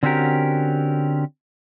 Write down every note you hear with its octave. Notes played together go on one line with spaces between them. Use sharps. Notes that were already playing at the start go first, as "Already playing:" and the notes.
D3 C4 C#4 F#4 G4 A#4